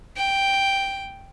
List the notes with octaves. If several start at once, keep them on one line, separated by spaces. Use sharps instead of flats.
G5